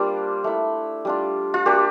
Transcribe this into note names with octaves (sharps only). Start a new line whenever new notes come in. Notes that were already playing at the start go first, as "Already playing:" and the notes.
Already playing: G3 A#3 D4 F4 C5
A3 E4
G3 D4 F4
F4
A#3 D4 F4 G4